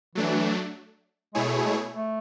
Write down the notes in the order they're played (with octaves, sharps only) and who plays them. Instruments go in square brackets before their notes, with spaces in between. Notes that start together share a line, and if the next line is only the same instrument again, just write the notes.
[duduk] E3 [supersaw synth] F#3 A3 D4
[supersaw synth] B2 A3 E4 G#4 C#5 [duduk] G#3
[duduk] G#3
A3